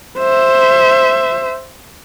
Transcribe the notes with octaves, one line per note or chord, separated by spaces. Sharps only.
C5 E5